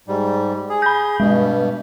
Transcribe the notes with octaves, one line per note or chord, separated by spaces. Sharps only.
G#2 G3
G#4
B5 G6
G2 B2 G#3